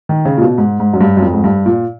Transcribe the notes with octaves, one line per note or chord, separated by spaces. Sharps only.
D#3
C#3
A#2
B2
G#2
G#2
F#2
G2
F#2
F2
G#2
G2
A#2